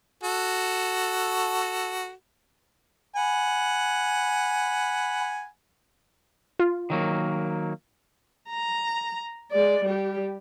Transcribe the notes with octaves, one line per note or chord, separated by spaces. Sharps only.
F#4 A4
F#5 G#5 B5
F4
D#3 F#3 A#3
A#5
G#3 D5
G3 G4